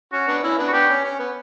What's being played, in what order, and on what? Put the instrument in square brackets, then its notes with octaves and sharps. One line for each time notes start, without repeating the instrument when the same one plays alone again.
[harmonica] C#4 [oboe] F#4
[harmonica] B3 D4
C#4 E4
B3 D4
[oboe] F#4
[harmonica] B3 D4 [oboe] G4
[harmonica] C#4
C#4
B3